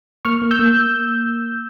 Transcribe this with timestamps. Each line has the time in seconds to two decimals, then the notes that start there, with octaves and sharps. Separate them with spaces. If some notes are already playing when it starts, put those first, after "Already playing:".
0.25 A#3 C#6 F6
0.42 A#3
0.51 E6 G6
0.59 A#3